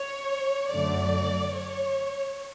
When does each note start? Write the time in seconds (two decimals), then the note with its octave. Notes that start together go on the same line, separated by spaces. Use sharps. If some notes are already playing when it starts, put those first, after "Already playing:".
Already playing: C#5
0.69 F#2 D3 F#3 A3 D5
1.53 C#5